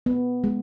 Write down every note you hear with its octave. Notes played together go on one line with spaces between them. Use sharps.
B3
G#3